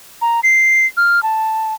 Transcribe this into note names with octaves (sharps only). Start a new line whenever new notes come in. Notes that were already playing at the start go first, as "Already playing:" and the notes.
A#5
C7
F6
A5